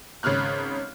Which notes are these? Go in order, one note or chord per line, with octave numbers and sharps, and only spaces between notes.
G#1 C#3 C#5 F6 F#6